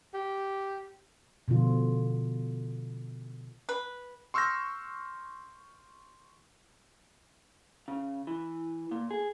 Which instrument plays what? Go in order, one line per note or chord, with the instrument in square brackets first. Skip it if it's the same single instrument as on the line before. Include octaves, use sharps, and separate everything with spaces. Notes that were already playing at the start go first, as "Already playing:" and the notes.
[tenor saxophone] G4
[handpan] B2 D3 F3 F4
[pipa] B4
[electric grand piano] C6 C#6 E6 F6 G6 A#6
[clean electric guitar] C#3
E3
A#2
G#4